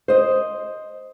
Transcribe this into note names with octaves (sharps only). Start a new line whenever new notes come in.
C5 D#5